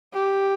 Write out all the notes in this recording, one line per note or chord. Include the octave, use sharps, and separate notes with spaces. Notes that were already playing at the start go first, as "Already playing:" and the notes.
G4